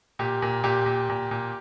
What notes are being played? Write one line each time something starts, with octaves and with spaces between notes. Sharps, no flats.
A#2 G4
A#2
A#2 G4
A#2
A#2
A#2